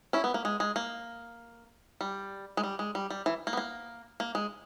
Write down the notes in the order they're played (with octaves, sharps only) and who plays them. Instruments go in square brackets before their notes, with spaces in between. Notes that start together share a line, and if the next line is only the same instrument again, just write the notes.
[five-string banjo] C#4 E4
B3
A#3
G#3
G#3
A#3
G3
G#3
G3
G#3
G3
G3
E3
A#3
B3
A#3
A#3
G#3